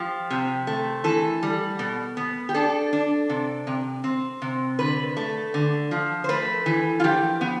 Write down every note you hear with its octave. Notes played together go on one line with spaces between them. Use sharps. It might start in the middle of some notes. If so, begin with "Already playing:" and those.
Already playing: F3 G4
C3
A3
E3 A4
G3
B2
B3
G4
D4 A4
D4
C3
C3
C4
C3
D3 B4
A3
D3
F3
C5
A3 B4
E3
F4
F3 G4
B3